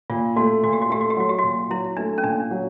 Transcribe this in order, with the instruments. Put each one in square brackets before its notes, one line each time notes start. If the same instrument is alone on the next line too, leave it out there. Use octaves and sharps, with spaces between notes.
[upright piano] A#2 [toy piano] F4
[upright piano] A3 [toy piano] F#4
[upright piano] A#2 [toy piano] F#4
[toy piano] G4
F#4
[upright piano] A3 [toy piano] G4
[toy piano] F#4
G4
[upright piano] F#3 [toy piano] F#4
[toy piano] G4
[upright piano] A#2 [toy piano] F#4
[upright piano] F#3 [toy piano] E4
[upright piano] A3 [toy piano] D4
[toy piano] C#4
[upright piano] A#2 [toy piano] D4
[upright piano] F#3